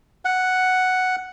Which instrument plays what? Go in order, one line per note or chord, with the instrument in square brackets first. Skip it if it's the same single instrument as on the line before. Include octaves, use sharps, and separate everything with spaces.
[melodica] F#5